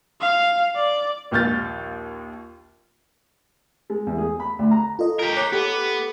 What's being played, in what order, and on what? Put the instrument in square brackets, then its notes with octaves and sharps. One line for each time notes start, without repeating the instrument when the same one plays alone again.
[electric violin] F5
D5
[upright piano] A#1 D#2 F6 G6 A6
[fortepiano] G#3
E2
G#4
B5
D2
A#5
[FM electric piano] F4 A4 D#5
[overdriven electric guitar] G4 A#4
[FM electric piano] C#5 D6 F#6
[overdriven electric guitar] B3 [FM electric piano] G4 A4 D6